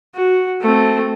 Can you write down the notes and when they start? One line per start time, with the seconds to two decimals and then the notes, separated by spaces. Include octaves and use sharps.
0.15 F#4
0.61 A3 C4